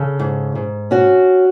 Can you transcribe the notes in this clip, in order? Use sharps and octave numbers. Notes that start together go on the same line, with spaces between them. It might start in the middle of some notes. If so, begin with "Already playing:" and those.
Already playing: C#3 A4
G#2
G#2
C#4 F#4